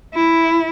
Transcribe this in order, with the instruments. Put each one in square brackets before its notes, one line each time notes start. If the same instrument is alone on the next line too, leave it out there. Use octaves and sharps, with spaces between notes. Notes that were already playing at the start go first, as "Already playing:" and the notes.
[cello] E4